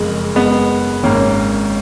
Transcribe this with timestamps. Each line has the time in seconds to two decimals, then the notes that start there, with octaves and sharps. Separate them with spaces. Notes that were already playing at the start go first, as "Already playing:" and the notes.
Already playing: F#1 F2 C#3 G#3
0.36 G#3 B3
1.03 G#1 G#2 D#3 A#3 C#4